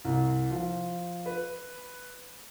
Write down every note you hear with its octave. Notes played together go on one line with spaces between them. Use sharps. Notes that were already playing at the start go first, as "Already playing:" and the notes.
C2
F3
B4